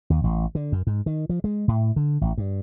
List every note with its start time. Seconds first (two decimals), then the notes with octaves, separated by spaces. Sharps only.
0.10 D#2
0.24 A1
0.55 D3
0.72 F#2
0.87 G#2
1.06 D#3
1.29 F3
1.44 G#3
1.68 A2
1.96 D3
2.21 A1
2.38 G2